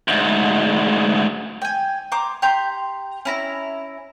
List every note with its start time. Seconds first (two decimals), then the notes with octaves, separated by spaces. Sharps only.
0.08 D2 G#2
1.62 G5 G#5
2.12 C5 A#5 D6
2.42 G4 A#5 C6 G6
3.25 C#4 E4 A#5